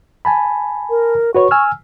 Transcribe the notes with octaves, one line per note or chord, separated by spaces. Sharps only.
G#5 A5 B5
A#4
F#4 B4 C#5 C#6
G#5 E6 F6